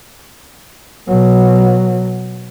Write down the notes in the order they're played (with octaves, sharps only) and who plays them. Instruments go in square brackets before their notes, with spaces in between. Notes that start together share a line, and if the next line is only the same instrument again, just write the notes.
[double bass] B2 F#3